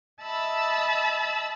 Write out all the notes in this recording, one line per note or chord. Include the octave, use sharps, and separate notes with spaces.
D#5 E5 A5 B5 E6